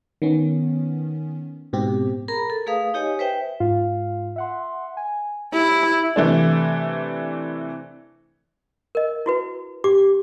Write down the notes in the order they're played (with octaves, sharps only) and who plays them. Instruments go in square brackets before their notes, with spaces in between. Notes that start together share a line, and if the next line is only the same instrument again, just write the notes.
[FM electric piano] D#3 B3 C#4
G#2 B2 C4 G4
[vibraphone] G#4 A#4 A#5 B5
A4
A3 G#4 B4 F5 D#6
D#4 G4 C#5 D#5 G#5
B4 C5 E5 G5
[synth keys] G#2 F4 F5
E5 F#5 C6
G#5
[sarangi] E4 [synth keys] G4
[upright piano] C3 E3 A3 D4
[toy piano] A#4 D#5
E4 F#4 B4
[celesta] G4 [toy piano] D6